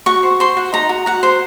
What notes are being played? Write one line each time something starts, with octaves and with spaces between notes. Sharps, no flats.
F#4 C#6
C5
C5 C6
F#4
D#4 A#5
F#4
F#4 F#5
C5